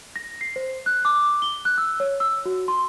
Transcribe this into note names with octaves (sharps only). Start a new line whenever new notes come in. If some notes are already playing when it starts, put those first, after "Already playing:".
A#6
C7
C5
F#6
D6
G7
F#6
E6
C#5
E6
F#4
C6